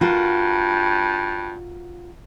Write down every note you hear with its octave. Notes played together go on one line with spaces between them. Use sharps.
G2 F4 F#4 A#4